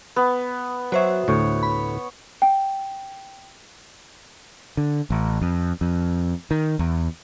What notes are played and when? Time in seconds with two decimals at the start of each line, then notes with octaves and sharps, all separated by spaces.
0.16 B3
0.92 F#3 F#4 C5 C#5 E5
1.28 D2 A2 C#5
1.63 B5
2.42 G5
4.77 D3
5.10 A1
5.41 F2
5.81 F2
6.51 D#3
6.79 E2